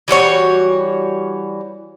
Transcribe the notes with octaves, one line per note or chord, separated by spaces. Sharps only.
E3 G3 F#4 C#5